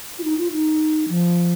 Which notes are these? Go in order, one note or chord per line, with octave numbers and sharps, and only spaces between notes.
F4
D#4
F4
D#4
F3